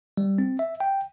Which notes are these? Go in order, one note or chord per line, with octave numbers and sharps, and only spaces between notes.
G3
C4
E5
G5